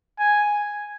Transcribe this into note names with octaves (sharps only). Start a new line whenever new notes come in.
G#5